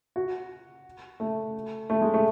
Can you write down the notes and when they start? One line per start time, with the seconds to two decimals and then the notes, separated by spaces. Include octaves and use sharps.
0.16 F#4
1.20 A3
1.90 A3
2.02 G#3
2.14 A3